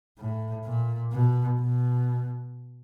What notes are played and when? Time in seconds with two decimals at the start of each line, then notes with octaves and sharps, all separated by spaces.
0.19 A2
0.66 A#2
1.13 B2
1.61 B2